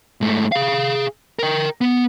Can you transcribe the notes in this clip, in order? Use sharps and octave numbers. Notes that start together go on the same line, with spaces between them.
G#2 A3
G#4 F5
A#4 G5
B3